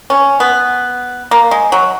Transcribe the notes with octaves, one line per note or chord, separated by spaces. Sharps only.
C#4
B3
A#3
G#3
F#3